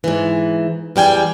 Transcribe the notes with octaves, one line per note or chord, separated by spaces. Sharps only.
G#2 E3
E2 G3 G5 G#5